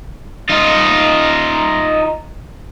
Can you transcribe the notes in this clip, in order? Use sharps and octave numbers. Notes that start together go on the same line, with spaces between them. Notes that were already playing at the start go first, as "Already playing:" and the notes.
D#4 F4